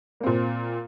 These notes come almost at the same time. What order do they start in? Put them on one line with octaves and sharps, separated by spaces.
A#3 C4 A#2